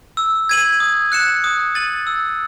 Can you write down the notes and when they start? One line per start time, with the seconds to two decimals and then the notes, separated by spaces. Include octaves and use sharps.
0.17 E6
0.49 G#6 D#7 F#7
0.80 D#6
1.12 F#6 C#7 E7
1.44 D#6
1.75 A6 D#7 F#7
2.07 E6